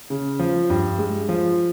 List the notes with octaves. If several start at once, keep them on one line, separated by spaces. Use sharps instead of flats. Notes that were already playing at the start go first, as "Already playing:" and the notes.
C#3
F3
G2
G#3
F3